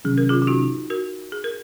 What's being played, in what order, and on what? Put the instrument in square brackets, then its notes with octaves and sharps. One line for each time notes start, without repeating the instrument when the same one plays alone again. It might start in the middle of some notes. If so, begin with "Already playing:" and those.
[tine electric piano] C3 D#3 F#3 C#4 [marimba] G#4
[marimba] A#4
F4 G#4
F4
D#4 F#4
F#4 A#4
G#4
A#4